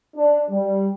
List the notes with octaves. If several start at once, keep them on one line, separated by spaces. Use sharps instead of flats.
D4
G3